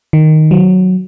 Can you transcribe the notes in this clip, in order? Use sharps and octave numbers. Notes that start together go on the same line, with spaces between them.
D#3
F#3